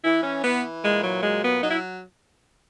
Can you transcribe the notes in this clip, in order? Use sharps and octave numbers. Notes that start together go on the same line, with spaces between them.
E3 E4
C#4
E3 B3
A#2 G#3
F#3
F#3 G#3
B3
F#3 D#4
E4